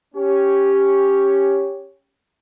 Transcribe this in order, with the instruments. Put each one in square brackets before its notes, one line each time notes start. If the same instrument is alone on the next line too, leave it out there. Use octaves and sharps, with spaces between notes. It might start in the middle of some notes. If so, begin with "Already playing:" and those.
[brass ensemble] C#4 G4